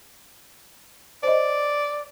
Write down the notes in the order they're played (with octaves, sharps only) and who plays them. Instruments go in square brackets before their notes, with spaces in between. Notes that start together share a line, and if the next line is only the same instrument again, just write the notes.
[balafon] C5 D#5 [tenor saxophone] D5